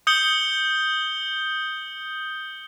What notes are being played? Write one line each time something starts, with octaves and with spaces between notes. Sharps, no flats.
D#6 G6 C#7 G7